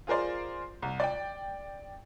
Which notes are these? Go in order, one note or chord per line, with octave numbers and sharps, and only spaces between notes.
F4 G#4 A#4 C5 D5
C2
D5 G5